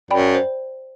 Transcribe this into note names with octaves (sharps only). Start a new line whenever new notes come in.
F#2 D5 G5 B5
C5